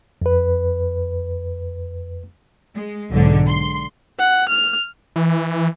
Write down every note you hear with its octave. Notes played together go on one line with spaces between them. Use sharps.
F2 B4
G#3
B1 G#2 D3
C6
F#5
F6
E3